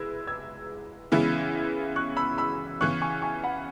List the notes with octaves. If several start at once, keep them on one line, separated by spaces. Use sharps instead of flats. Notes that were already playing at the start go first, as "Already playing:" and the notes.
Already playing: G#3 E4 B4 E6 G#6
E6 G#6
C#3 E3 G#3 B3 E4
C#6 F#6
B5 E6
B5 E6
C#3 E3 B3 C#6 F#6
G#5 C#6
G#5 C#6
F#5 B5